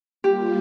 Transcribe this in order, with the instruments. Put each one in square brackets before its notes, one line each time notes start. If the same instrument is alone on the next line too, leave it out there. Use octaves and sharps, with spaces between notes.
[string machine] G3 A#3 F4 [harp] G4